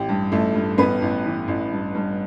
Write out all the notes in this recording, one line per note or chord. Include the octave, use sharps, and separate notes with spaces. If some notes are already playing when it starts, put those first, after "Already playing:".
Already playing: A1 G4
G2
A1 A3 A4
G2
A1 B3 B4
A1
E3
A1
G2
G2